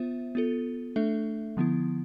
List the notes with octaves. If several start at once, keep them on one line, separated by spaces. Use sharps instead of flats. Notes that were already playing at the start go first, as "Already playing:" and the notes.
Already playing: B3 F4 C5 E5
B3 F4 A4
A3 D4 A4 E5
D3 F3 B3 E4